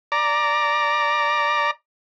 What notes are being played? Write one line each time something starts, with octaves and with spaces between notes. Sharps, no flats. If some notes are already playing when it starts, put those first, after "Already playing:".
D5 A#5